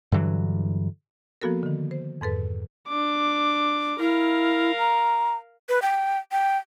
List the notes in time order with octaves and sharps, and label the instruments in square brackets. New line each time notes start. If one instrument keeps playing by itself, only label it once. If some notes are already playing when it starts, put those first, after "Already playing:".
[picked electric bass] G2 D3 E3 F#3
[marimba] F3 A#3 B3 F#4 A4 A#4
D3 D#3
C5
F2 G#2 A4 B4
[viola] D4 D6
[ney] E4 [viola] A#4 F5
[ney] A#5
[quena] B4
G5
G5